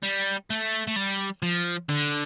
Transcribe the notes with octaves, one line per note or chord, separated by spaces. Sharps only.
G3
A3
A3
G3
F3
D3